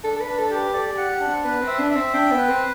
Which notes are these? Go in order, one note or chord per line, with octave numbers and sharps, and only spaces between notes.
D4 A4
A4
B4
D4
A4
G4
B4
A4 D5
G4
F#5
G4
D4
C4
B3 B4
C4
E5
D4
E5
C4
D4 G5
B3
B4
C4